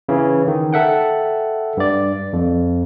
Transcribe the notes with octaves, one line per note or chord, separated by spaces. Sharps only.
C#3 E3
D#3
A4 E5 F#5 G5
G2 D5
F2